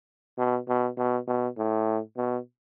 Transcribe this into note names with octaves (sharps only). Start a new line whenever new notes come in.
B2
B2
B2
B2
A2
B2